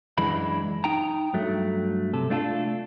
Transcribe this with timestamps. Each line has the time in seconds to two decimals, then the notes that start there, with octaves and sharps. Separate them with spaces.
0.18 F#2 E3 G#3 D4 B5
0.84 D#4 G5 A#5
1.34 G2 F#3 A3
2.14 C3 A4
2.30 A3 D4 F4 G#4 A4